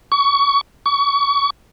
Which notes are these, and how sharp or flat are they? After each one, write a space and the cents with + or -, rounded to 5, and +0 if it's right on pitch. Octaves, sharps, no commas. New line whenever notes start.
C#6 +25
C#6 +30